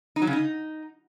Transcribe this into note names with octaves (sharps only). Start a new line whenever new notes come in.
D#4
F#3
C#3
D#4